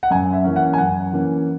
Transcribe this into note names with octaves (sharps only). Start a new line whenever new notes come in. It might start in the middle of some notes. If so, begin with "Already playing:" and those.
F#5
F#2 G#5
E5
E3 A#3 C#4
F#5
G#5
F#2 F#5
E3 A#3 C#4